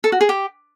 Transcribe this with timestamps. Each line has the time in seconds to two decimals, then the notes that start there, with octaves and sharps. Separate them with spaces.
0.04 A4
0.12 F#4
0.21 G#4
0.29 G4